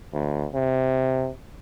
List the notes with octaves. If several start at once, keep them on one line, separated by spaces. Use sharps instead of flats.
D2
C3